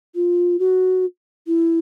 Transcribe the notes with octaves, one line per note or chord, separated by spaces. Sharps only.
F4
F#4
E4